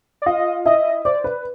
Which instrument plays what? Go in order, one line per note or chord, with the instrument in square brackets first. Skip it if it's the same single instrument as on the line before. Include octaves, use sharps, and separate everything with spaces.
[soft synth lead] D5
[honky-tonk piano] F4 F5 [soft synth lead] D#5
[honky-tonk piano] E4 E5 [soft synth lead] D#5
[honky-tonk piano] C5 [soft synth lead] D5
[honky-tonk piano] B4